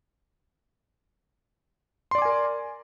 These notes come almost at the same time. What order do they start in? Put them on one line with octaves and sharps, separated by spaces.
C6 D5 D6 G#5 A#4